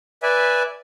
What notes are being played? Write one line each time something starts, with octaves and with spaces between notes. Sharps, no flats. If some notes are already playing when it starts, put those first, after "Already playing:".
B4 D5 E5 G#5